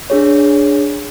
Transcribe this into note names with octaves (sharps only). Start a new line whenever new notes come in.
D4 G#4 C#5